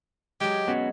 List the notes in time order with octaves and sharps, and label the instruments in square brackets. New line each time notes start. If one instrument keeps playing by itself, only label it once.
[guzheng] F#3 G#3 [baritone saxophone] G4
[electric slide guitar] B3 C#4 F#4